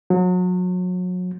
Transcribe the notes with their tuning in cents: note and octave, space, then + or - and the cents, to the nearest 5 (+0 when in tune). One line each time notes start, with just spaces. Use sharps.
F#3 -35